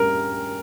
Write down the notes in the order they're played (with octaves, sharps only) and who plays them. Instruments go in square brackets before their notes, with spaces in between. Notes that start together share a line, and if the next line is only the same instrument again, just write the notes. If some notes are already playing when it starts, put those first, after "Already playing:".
Already playing: [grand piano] G2 G3 C#4 A#4